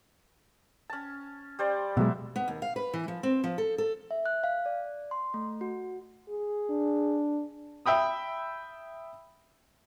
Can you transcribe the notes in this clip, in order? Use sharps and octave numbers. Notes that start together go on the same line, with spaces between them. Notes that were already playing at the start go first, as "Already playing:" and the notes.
C#4 A5
G3 C5 D5
B2 F#3 G#3 F#4 E5
B3
D#2
F5
B4
E3
F3
C4
F3
A4
A4
E5
F#6
F5
D5
C6
A3
F#4
G#4
D4
E5 G5 B5 D#6